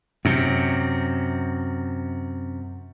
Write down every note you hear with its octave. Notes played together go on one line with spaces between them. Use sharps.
F#2 C3